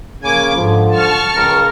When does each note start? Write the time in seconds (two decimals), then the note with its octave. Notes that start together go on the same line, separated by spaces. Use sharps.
0.23 C#3 A#3 G#5 D6
0.56 G#2 D3 F3
0.95 A5 C#6 F6
1.36 C#2 C#3 A#4